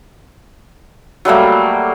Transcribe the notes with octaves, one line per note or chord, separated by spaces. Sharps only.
F#3 G3 A3 A#3